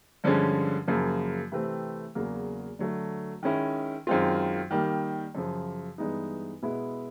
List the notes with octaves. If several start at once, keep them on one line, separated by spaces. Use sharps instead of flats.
G2 D3 F3 G#3 C#4
F#2 C#3 F3 A#3
C3 E3 A3 C4
E2 C#3 F#3 A#3
D3 F#3 A3
D#3 G#3 C#4 E4
F#2 D#3 G#3 C4 F4
D#3 G3 A#3
F#2 C#3 F3
G2 E3 G#3 B3 D#4
B2 G#3 B3 E4